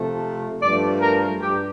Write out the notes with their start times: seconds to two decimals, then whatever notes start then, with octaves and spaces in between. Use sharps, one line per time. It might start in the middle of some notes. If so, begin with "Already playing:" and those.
Already playing: C3 F3 A3
0.62 G2 F3 A3 D5
1.01 A#4
1.41 G2 G4